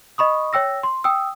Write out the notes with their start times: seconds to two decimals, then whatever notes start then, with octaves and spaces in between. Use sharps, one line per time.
0.18 D#5 B5 C#6 D#6
0.53 C#5 G5 E6 A#6
0.83 C6
1.04 G5 D#6 E6